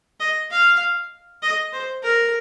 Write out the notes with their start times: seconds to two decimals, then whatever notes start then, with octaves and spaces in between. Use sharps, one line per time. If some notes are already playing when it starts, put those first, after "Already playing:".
0.20 D#5
0.51 F5
1.42 D#5
1.73 C5
2.03 A#4